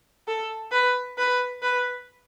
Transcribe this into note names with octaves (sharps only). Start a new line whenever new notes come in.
A4
B4
B4
B4